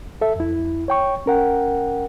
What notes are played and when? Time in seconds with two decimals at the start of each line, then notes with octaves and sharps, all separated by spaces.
0.21 A4 E5
0.36 F2 E4
0.88 C#5 G5 C#6
1.26 C#4 A#4 F#5 G5